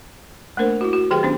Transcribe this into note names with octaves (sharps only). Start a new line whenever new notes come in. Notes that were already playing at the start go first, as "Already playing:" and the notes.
A3 A#3 D4 A#4 C5
E4 F#4
F#4
D#3 F#3 G4 G#4 B4 G5
D#3 B3 C#4 D4 C5